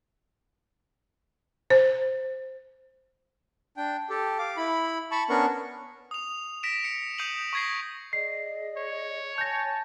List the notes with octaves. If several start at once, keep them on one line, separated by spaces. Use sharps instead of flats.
C5
D4 G5
G4 A4
F5 D6
E4 B5
A5 B5 C#6
B3 C#4 D4 A#4 C#6
D#6 F7
A#6 B6 D7 E7
C#7
D#6 G6 C7 C#7 D#7 F#7
C#6 D#6 G#6 A#6 C7
G#4 D5 D#5 C7
C#5
G#5 A5 G6 A#6